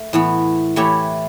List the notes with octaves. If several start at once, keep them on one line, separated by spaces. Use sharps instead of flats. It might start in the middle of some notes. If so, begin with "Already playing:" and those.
Already playing: A3
A2 E3 B3
E3 A3 E4 G4 C#5